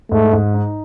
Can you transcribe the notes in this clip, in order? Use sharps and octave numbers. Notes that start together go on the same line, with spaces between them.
G#2 A3
G#2
D#4